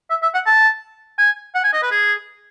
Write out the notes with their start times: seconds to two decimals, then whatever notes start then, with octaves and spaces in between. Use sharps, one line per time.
0.10 E5
0.22 E5
0.34 F#5
0.46 A5
1.19 G#5
1.55 F#5
1.64 G#5
1.73 D#5
1.82 B4
1.91 G#4